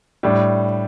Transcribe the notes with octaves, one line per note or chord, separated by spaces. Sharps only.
A2 G3 D4